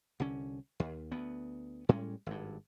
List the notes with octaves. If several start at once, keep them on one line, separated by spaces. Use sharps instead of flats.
C2 D3 C#4
D#2
D2 B3
A2 G3 G#3 C#4
G#1 G2